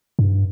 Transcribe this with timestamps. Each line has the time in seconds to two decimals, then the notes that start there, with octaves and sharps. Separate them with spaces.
0.19 G2